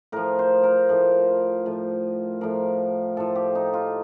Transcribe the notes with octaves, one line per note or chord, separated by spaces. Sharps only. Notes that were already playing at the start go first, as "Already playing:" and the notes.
A2 F3 A#4
C5
A#4
A2 F3
A2 F3
A2 F3 A#4
A2 F3 A4
G4
D#4
F4